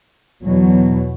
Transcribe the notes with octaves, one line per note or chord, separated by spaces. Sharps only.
E2 B2 F#3